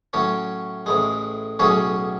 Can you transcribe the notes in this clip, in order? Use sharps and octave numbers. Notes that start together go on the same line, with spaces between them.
A2 F#3 C#4
A1 A2 G#3
B1 A2 F#3 C#4 G#4